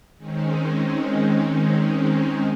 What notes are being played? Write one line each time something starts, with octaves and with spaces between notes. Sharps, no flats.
D#3 G#3 C4 C#4 D#4